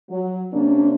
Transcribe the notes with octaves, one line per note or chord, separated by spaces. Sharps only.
F#3
C3 A#3 C#4 D4